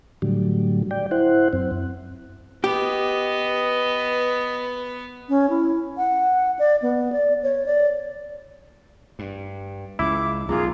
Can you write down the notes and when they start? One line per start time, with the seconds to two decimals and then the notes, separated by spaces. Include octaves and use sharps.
0.22 A2 D3 F#3 G3
0.91 D5 G5
1.11 E4 C5 F#5
1.53 F#2 C4
2.64 B3 G4 B4 D#5
5.29 C#4
5.50 E4
5.97 F#5
6.59 D5
6.82 B3
7.12 D5
7.43 C#5
7.66 D5
9.19 G2
9.99 C#2 C#3 E4 D6
10.48 B1 F#2 F4 G#4 A#5